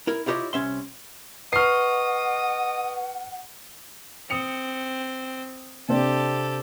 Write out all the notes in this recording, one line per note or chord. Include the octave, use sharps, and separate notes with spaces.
E4 A#4
E4 F4 G4 A#4 C#5 D#5
C2 C#4 E5 C6
B4 D#5 F#5 C#6 F6 C7
C4 D#6 C#7 F7
C3 C4 D4 G4 A4